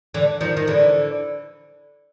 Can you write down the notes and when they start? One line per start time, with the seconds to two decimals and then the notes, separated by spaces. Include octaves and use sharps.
0.14 D3 E3
0.41 D#3 F3
0.57 D#3
0.67 D3 E3